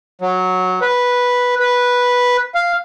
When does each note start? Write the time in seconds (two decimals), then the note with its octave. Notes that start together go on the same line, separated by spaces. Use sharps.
0.22 F#3
0.82 B4
1.60 B4
2.55 F5